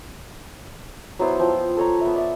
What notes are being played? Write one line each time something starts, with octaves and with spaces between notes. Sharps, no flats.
F#3 B3 E4 C5
F3 G5
A4 C#5 A#5
B3 E5
D5 E5